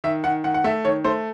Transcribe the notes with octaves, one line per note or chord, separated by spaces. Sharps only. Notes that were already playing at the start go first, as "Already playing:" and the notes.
D#3 E5
D#3 F#5
D#3 F#5
F#5
A3 E5
D#3 C#5
A3 C5